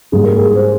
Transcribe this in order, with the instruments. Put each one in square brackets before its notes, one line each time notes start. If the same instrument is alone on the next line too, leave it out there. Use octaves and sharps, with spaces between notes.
[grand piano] G#2 G3 A#3 G#4
A#4
G#4
C5